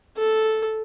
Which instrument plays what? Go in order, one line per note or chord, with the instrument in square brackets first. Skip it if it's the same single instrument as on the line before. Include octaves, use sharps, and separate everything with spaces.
[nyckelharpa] A4